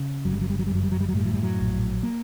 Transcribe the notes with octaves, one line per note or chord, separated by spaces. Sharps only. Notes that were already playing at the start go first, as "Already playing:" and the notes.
Already playing: C#3
G1 F#3
G3
F#3
G3
F#3
F#2 G3
F#3
G3
F#3
G3
F#3
A2 G3
F#3
G3
F#3
A#1
A#3